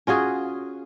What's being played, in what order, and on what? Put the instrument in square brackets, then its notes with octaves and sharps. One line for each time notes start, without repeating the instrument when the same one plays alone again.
[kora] C#4 F4 F#4 G#4